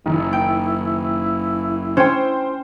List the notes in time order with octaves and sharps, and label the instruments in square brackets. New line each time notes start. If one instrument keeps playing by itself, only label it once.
[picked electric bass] F#1 [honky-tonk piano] D#3 [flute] E4
[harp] G5
[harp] C#4 [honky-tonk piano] C5 G5